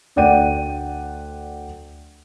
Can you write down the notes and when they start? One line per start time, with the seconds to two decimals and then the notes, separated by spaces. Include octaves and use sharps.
0.16 D2 D5 F#5 G5 D#7